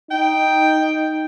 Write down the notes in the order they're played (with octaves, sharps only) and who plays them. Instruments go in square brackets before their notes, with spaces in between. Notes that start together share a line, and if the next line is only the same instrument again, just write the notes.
[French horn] D#4 [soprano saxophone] G5